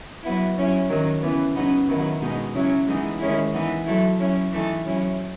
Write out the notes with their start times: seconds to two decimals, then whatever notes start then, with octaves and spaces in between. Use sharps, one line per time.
0.23 F#3 B3 E4
0.56 F#3 C#4 E4
0.89 D#3 F#3 C#4
1.22 C#3 E3 B3
1.55 C#3 F#3 B3 D#4
1.88 D#3 F#3 B3 E4
2.21 B2 G#3 B3 D#4
2.54 C#3 F#3 C#4 E4
2.87 E3 G#3 B3 D#4
3.19 D#3 G#3 C#4 E4
3.53 E3 B3 D#4
3.86 F#3 A3 E4
4.19 F#3 C#4 E4
4.51 E3 A3 D#4
4.85 F#3 C#4 E4